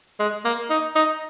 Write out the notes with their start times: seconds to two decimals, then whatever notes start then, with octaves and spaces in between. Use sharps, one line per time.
0.20 G#3
0.45 A#3
0.70 D#4
0.96 D#4